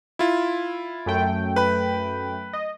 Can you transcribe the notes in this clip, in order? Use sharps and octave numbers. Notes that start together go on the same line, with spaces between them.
E4 F4
F#2 A3 G5
B4 B5
D#5